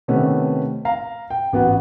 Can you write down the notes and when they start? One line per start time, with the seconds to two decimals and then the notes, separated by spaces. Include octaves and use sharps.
0.08 C3 D#3 A3 B3 C#4
0.85 F5 A#5
1.30 G5
1.53 A1 B3 F#4